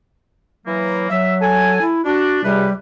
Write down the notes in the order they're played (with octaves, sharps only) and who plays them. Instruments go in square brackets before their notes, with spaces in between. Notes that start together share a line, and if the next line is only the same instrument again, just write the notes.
[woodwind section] E3 F#3 A#3
[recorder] F#3 [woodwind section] E5
[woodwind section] A4 G#5
[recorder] E4
[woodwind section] D4 [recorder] F#4
[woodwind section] C#2 C3 B4 [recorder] G3